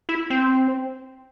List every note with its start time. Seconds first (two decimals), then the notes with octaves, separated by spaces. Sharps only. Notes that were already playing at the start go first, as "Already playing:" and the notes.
0.09 E4
0.30 C4